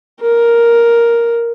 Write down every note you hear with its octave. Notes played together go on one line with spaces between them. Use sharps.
A#4